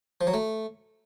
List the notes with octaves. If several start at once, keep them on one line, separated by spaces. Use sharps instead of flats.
F3
F#3
A3